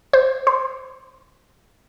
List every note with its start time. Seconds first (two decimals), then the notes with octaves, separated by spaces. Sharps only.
0.13 C5
0.47 C5